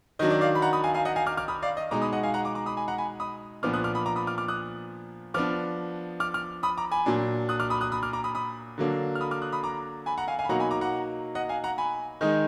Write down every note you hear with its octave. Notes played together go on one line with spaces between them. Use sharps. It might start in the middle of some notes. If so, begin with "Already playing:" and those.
D#3 F#3 D4 D#5
D5
D5 F5
B5
F#5 A#5
B5 D#6
F5 G#5
F5 G#5
D#5 F#5
F5 G#5
D6 F6
D6 F6
B5 D#6
D5 F5
D#5
B2 G#3 D#4 A#5 D6
B5 D#6
D#5 F#5
F5 G#5
F#5 A#5
A#5 D6
A#5 D6
B5 D#6
G#5 B5
F#5 A#5
G#5 B5
B5 D#6
A#2 F3 B3 D4 D6 F6
D#6 F#6
D6 F6
B5 D#6
A#5 D6
B5 D#6
D6 F6
D6 F6
D#6 F#6
F3 B3 D4 D6 F6
D6 F6
D6 F6
B5 D#6
A#5 D6
G#5 B5
A#2 F#3 D4
D#6 F#6
D6 F6
B5 D#6
D#6 F#6
B5 D#6
D6 F6
A#5 D6
B5 D#6
B5 D#6
D3 F#3 A#3 D4
F6
B5 D#6
D6 F6
D#6 F#6
B5 D#6
A#5 D6
G#5 B5
F#5 A#5
F5 G#5
F5 G#5
B5
B2 F#3 A#3 D#4 F#5 A#5
G#5 B5
A#5 D6
F#5 A#5
D#5 F#5
F5 G#5
F#5 A#5
G#5 B5
D#3 G#3 D#4